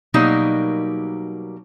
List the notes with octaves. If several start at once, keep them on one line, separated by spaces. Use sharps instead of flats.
B2 F#3 G3 A#3 D#4 A#4